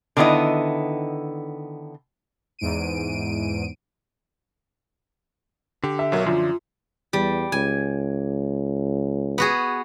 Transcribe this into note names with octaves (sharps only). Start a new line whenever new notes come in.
D3 D#3 B3 E4 D#5
E2 G#2 D7 D#7
D3 G4
E5
B1 F#3 A#4
F#2 D3 F3 F4
E2 G3
C#2 G#5
B3 F#4 G#4